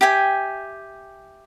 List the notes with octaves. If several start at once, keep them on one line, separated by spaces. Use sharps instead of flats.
G4 E5 G5 G#5